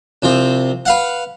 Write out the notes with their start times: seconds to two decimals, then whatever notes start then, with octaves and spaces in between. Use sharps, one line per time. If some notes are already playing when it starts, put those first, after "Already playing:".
0.22 C2 F3 C4
0.86 B4 F5 F#5